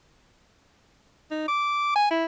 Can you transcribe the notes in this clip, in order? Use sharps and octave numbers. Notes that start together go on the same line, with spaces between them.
D#4
D6
G#5
E4